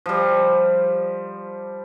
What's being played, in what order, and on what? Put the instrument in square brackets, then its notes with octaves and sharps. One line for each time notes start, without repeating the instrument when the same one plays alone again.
[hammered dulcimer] F3 G3